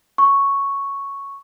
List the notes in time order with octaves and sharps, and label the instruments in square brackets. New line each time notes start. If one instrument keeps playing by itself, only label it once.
[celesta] C#6